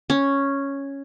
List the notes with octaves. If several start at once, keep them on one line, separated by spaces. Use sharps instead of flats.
C#4